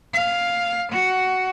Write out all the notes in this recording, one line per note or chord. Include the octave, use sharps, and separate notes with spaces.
F5
F#4